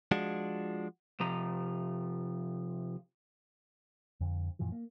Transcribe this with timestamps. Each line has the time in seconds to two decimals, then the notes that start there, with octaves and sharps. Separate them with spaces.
0.11 F3 G#3 D4 F4 F#4
1.20 C3 F3 A#5
4.21 F2 D3
4.59 F#2 A#2 E3 F3
4.72 A#3